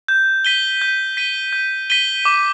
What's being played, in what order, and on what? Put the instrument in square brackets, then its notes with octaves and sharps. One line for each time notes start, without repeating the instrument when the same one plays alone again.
[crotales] G6
B6 D#7 G7
G6
B6 D#7 G7
G6
B6 D#7 G7
D6